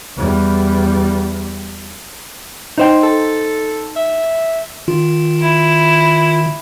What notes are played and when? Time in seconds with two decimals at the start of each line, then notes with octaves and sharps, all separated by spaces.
0.17 E2 G3
2.78 D#4 C5 G5
3.03 A4
3.96 E5
4.88 D#3 F4
5.40 E4